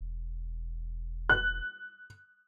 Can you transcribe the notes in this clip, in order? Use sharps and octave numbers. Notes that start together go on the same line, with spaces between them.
E1
F#6